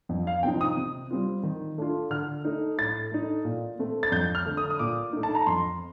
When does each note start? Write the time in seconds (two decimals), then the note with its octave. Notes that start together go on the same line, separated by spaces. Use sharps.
0.09 F2
0.27 F5
0.43 C3 F3 C4 D#4 G5
0.61 D#6
0.77 C3
1.11 G3 C4 F4
1.43 D#3
1.78 A3 D4 F4
2.10 D3 F6
2.45 A3 D#4
2.78 A2 A6
3.12 A3 D#4
3.45 A#2
3.79 A3 C4
4.03 A6
4.12 F2 G6
4.35 F6
4.45 D3 A3
4.57 D#6
4.70 D#6
4.79 A#2 D6
5.13 A3 D#4
5.23 A5
5.35 A#5
5.47 F2 C6